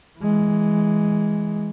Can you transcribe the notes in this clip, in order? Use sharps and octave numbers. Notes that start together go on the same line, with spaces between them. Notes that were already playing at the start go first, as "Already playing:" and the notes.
E3 G#3